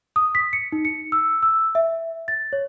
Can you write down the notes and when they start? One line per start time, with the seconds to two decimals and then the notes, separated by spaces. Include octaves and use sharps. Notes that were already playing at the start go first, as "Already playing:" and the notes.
0.16 D#6
0.35 B6
0.53 C#7
0.72 D#4
0.85 C#7
1.12 E6
1.43 E6
1.75 E5
2.28 A6
2.53 C#5